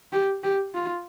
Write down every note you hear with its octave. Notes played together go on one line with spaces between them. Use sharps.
G4
G4
F4